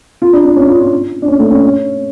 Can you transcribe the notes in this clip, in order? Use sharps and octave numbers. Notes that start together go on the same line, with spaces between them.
F4
D4
D4
C#4
F4
F4
D4
C#4
A3
C#4
C#4